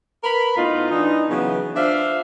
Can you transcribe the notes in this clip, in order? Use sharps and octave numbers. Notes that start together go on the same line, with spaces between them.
A#4 B4 B5
A2 B3 D#4 F4
E3 D4 D#4
C#3 E3 F#3 B3
D4 F4 C5 E5 F5